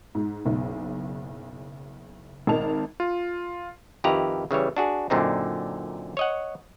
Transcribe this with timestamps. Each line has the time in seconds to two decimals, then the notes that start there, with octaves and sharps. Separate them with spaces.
0.15 G#2
0.45 F#1 B1
2.47 G#1 D#4 A#4 A5 F7
3.00 F4
4.04 F2 D#3 E4 G4 B4 A#5
4.51 C#3 E3 G3 C#5
4.77 D4 F#4 G#4
5.10 F#2 A#2 D3 C4 D#4
6.17 C#5 D#5 F#5